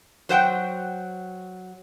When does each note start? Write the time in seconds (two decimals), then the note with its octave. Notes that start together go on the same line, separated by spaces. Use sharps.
0.29 F#3 C5 F#5 G5